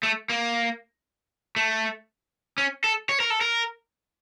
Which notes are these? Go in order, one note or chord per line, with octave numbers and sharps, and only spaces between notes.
A3
A#3
A3
C#4
A4
C#5
A#4
A4
A#4